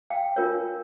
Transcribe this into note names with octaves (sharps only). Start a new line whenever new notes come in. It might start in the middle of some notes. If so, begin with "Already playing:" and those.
F5 G5
D4 F4 A#4 C#5